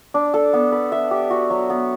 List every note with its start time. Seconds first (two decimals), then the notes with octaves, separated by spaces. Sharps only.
0.14 D4
0.34 A4
0.53 B3
0.72 B4
0.92 E5
1.11 G4
1.30 F#4
1.50 F#3
1.70 B3